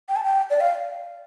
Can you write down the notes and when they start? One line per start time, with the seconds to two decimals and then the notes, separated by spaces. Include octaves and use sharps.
0.09 G5
0.16 A5
0.24 G5
0.50 D5
0.60 F5